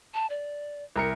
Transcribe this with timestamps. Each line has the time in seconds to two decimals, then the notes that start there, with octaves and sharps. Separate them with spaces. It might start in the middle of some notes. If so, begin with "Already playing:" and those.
0.14 A5
0.30 D5
0.96 C2 A#4 E5 C#7